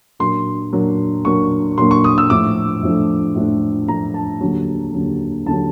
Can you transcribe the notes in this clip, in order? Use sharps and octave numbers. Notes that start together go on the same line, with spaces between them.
A#2 F#3 A#3 D4 C6
A#2 F#3 A#3 D4
A#2 F#3 A#3 D4 C#6
A#2 F#3 A#3 D4 C6
C#6
D#6
E6
A2 F3 A3 D4 D6
A2 F3 A3 D4
A2 F3 A3 D4
A2 F3 A3 D4 A#5
A5
D#2 D3 F#3
D#2 D3 F#3
D#2 D3 F#3 A5